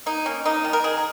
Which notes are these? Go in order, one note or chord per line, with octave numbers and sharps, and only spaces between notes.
A#3 D#4
A#3 C#4
A#3 D#4
D#3
A#4
D#3 G#4